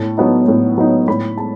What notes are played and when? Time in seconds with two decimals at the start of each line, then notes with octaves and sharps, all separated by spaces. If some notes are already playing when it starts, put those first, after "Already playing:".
Already playing: A2 A5
0.17 F#3 B3 D#4
0.48 A2
0.78 F#3 B3 D#4
1.08 A2 B5
1.38 G#3 A5